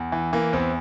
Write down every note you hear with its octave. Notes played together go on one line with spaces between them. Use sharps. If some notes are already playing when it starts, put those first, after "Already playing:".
Already playing: E2
E3
E3 A#3
E2 C4